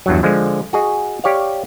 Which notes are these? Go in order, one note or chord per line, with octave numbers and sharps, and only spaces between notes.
E2 G2 F#3
D3 F3 G#3
F#4 G#4 D#5
G4 C#5 D5 F5